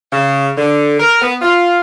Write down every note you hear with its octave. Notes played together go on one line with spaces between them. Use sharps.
C#3
D3
A#4
B3
F4